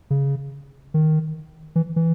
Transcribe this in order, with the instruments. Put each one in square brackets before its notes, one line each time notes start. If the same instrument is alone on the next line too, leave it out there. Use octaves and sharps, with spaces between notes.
[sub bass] C#3
D#3
E3
E3